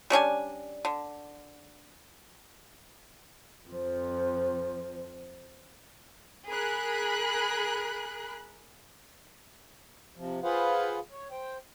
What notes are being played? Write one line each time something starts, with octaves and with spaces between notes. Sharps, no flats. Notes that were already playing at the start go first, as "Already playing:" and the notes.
G3 C#4 D4 G#5
D3
F2 F3
G#4 A#4 B5 F#6
C3 F3
F4 G#4 B4 C5 F5 F#5
C#5
C5 G5